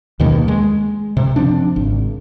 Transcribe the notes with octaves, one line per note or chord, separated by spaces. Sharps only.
D#2 B2 D#3 A#3
G#3
F#2 C3
C#3 F3 C4 D4
G#1